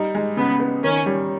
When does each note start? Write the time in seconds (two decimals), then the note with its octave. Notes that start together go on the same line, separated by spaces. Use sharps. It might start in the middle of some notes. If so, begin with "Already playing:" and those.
Already playing: G3 D#4
0.15 G#3
0.37 C#3 B3
0.60 B3
0.83 D#3 C#4
1.06 G3